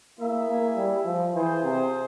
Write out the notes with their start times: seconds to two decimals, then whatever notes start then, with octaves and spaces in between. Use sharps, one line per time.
0.19 A#3 E4 G#4 E5
0.48 A#3
0.76 G3
1.05 F3
1.34 E3 F4 G#4 C5
1.63 C3